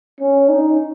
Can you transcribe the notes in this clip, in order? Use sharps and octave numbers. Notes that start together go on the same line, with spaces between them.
C#4
D#4